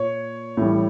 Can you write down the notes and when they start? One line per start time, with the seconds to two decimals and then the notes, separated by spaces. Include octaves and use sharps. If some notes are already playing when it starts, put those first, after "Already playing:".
Already playing: A#2 C#5
0.57 A2 E3 G3